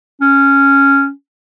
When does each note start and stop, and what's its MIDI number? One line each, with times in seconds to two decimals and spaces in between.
0.22 1.10 61